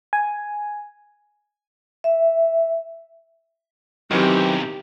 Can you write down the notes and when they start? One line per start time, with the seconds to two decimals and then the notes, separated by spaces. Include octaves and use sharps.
0.13 G#5
2.04 E5
4.11 B1 C3 D#3 E3 F#3 C4 G4